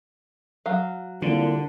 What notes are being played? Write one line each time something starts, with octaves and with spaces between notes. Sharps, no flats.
F#3 F5
C2 A#2 D3 D4